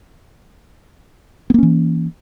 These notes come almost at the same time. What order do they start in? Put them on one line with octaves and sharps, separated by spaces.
B3 A#3 C#4 E3